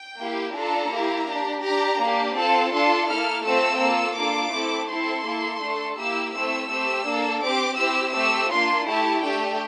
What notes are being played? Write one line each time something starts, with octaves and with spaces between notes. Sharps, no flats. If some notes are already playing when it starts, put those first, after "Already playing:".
Already playing: G5
A#3 E4 G4
D4 F4 A4 A#5
A#3 E4 G4
D4 G4
D4 G4 A#5
A#3 D4 G4
C4 F4 A4 A5
D4 F4 A4 C6
A#3 E4 A4 F6
A3 C4 F4 A4 E6
A#3 F4 A4
A#3 D4 F4 A4 D6
A3 C4 E4 A4
C4 E4 A4 C6
A#3 E4 A4
A3 D4 A4
A#3 E4 G4 E6
A3 C4 E4 E6
A3 C4 G4 E6
A#3 D4 A4
C4 G4 D6
C4 E4 G4 E6
A3 C4 G4 E6
A#3 D4 F4 C6
A3 E4 G4 A5
A3 D4 G4 G5